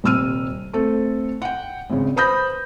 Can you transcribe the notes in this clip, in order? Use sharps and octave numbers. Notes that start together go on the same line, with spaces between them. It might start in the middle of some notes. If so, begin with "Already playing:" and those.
D#1 C3 E6 F6 D#7
A3 C4 A4
F#5 G5
G#1 C#3
B4 C5 B5 D#6 G6 A#6